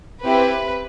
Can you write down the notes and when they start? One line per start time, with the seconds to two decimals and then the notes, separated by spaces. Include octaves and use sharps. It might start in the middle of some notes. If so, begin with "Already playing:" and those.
0.25 C4 E4 G4 B4